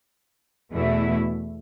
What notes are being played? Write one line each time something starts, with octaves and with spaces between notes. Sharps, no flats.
E2 B2 A3 E4